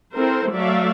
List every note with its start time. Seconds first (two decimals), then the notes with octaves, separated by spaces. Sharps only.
0.14 C4 E4 A4 A#4 C5
0.52 F#3 A3 A4 D5 E5 F5